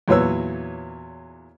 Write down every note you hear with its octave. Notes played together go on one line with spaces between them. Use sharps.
E2 A#2 F#3 B4 C#5 E6